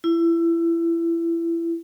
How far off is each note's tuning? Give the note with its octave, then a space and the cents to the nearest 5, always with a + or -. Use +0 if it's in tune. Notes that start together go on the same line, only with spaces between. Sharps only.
E4 +25